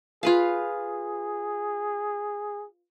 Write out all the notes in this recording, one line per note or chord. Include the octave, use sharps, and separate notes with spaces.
F4 G#4 B4 F5